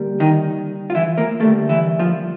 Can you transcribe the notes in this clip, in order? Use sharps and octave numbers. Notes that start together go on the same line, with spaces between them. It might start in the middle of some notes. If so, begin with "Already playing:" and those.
Already playing: D3 G3 A#3
D#3 D#4
F4
E3 E4
A#3 A#4
D3 G3 A3 A#3 A4
E3 E4
F3 F4